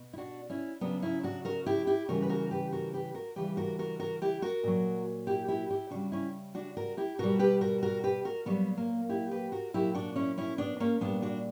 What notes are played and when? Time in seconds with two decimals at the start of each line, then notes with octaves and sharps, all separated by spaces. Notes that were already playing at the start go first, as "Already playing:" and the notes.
Already playing: B2
0.13 E4
0.18 D4 F#4
0.50 C#4 E4
0.81 C#3 F#3 B3 D4
1.02 C#4 E4
1.23 D4 F#4
1.45 F#4 A#4
1.66 E4 G4
1.87 E4 G4
2.08 C#3 E3 G3 F#4 A#4
2.22 B4
2.29 F#4 A#4
2.51 G4 B4
2.72 F#4 A#4
2.93 G4 B4
3.14 F#4 A#4
3.36 C#3 E3 G3 G4 B4
3.57 F#4 A#4
3.79 F#4 A#4
3.99 F#4 A#4
4.22 E4 G4
4.42 F#4 A#4
4.64 A#2 F#3
5.27 E4 G4
5.48 E4 G4
5.70 E4 G4
5.91 C#3 G3 D4 F#4
6.12 C#4 E4
6.55 D4 F#4
6.77 F#4 A#4
6.97 E4 G4
7.19 B2 G3 F#4 A#4
7.39 G4 B4
7.61 F#4 A#4
7.82 F#4 A#4
8.04 G4 B4
8.25 F#4 A#4
8.46 A#2 F#3 G3 B3
8.77 A#3
9.09 E4 G4
9.31 G4 B4
9.52 F#4 A#4
9.74 A#2 F#3 E4 G4
9.94 D4 F#4
10.16 C#4 E4
10.38 C#4 E4
10.58 B3 D4
10.80 A#3 C#4
11.01 A#2 G3 B3 D4
11.22 D4 F#4